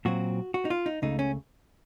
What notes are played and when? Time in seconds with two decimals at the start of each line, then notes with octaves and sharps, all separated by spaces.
0.05 A#2 F#3 C4 F#4
0.54 F#4
0.65 D#4
0.70 F4
0.86 D#4
1.02 C#2 C#3 A3 D#4
1.19 C#4